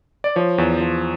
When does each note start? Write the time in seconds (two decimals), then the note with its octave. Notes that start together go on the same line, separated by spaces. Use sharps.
0.24 D5
0.36 F3 C#5
0.58 E2
0.81 F3